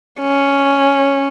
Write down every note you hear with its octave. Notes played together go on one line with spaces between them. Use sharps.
C#4